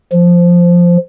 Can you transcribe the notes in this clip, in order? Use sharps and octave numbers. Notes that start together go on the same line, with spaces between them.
F3